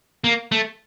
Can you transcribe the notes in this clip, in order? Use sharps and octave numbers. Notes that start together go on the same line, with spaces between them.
A#3
A3